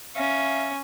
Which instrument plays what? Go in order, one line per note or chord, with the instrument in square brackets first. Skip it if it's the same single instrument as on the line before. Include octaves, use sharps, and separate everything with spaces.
[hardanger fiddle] C#4 [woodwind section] E5 F5 A#5